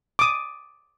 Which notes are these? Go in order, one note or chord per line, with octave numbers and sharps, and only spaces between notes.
D6 D#6